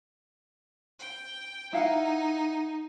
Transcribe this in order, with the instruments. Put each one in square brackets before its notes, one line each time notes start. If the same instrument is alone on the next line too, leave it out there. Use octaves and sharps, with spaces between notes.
[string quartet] G5
[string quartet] D#4 [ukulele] E4 F5 F#5